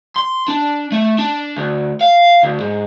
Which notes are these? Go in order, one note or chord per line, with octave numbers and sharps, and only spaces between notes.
C6
D4
A3
D4
D2
F5
D2
G#2